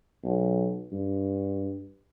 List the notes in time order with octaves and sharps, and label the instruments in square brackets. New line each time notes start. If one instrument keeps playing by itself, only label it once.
[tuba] B1
G2